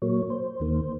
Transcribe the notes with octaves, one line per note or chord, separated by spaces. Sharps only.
A#2 F#3 A#3 C#5
C5
D#2 D#3 A#3